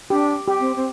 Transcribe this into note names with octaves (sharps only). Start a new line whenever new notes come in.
D4 G4
G4
C4
C4